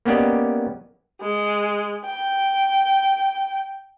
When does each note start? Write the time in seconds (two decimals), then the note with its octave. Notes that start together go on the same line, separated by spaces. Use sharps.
0.05 A#3 B3 C#4 G4 D5 D#5
1.21 G#3
2.05 G5